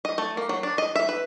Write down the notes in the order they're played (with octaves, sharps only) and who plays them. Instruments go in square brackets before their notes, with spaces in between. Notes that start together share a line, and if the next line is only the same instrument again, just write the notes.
[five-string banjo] D#5
A3
A#3
F#3
D4
D#5
E5
B4